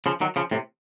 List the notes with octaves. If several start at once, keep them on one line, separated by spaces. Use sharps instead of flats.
C#3 F3
D#3 F#3
C#3 F3
A2 C3